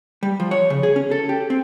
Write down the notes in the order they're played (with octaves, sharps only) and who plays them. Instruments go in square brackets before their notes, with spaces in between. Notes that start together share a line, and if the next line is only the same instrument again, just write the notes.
[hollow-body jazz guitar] G3
F3
C#5
C#3
G#4
C#4
A4
G4
C4